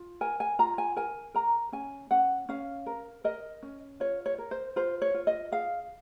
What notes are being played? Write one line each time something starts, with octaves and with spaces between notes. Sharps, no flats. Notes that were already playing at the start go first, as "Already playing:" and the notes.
Already playing: F4
A#4 G#5
G#5
F4 A#5
G#5
A#4 G#5
A#4 A#5
C#4 G#5
C#4 F#5
C#4 F5
A#4
A#4 D#5
C#4
F4 C#5
C#5
A#4
C5
F4 C5
C#5
F4
D#5
G#4 F5